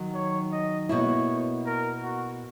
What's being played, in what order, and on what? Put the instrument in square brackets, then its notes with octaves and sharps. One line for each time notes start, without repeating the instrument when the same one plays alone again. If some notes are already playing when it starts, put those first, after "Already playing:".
Already playing: [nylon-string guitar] D#3 F#3
[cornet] C#5
D#5
[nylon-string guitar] B2 A#3 E4 [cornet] C#5
[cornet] A#4
F#4